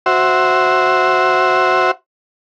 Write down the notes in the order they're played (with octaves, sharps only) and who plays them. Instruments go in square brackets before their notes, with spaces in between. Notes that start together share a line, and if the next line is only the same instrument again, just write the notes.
[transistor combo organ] F#4 C5 E5